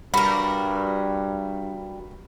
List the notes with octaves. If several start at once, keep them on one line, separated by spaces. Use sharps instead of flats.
G2 G3 F#4 A#4 B5